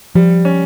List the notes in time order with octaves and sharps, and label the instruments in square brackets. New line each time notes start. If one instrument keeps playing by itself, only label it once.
[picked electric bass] F3 [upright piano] G3
[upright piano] C#4